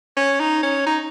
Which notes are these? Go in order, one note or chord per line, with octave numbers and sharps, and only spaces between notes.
C#4
D#4
C#4
D#4